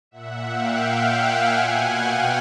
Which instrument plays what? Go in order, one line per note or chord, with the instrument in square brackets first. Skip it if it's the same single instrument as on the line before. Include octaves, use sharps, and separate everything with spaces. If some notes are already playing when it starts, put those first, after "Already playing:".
[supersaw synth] A#2 E5 F#5
F5 G5
F#5 G#5
B2
F5 G5